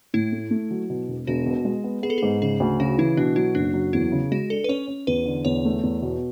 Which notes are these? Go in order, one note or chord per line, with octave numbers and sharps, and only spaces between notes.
A2 E4
A3
A3
F#3
B2
E1
E1 F#4
B2
G#3
B3
B3 G#4
A4
G#2 G#4
C#3 G#4
D2
C#3 F#4
E3 E4
B2 D4
F#3 E4
F#1 D4
F#3
E2 E4
C#3
G#3 F#4
D4 A4
B4
C#4 C#5
C#4
E2 B4
D3
E2 C#5
A3
E2
B2